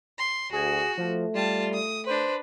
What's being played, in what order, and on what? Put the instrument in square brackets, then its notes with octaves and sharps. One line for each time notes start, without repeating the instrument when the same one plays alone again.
[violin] C6
[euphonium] D2 [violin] F#4 [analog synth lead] G#4
[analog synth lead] F3 [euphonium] A3
[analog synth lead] G3 [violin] F4 A5
[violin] D#6
[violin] D4 B4 [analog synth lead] C5